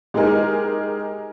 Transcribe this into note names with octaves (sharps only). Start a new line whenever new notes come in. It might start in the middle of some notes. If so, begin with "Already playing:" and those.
G#3 D#4 G4 G#4 A#4